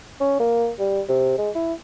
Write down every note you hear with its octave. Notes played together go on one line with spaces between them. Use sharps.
C#4
A#3
G3
C3
G#3
E4